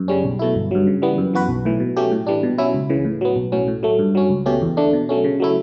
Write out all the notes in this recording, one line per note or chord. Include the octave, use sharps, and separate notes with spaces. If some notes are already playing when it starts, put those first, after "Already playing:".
Already playing: F#2
C#3 G3 C#4
B1
B2 A3 E4
G1
G2 F#3
C#3
E3 G3 B3
F#2
E3 B3 F#4 B4
B1
A2 E3
B2
F#3 A3 C#4 G4
A2
E3 G3 D4
B2
F#3 C#4 E4
C#2
C#3 E3
A2
F#3 B3
B1
A2 F#3 C#4
A2
F#3 A3
G2
F#3 C#4
C#2
B2 A3 C#4 G4
E2
D3 A3 D4
B2
F#3 A3 C#4
C#3
F#3 A3 E4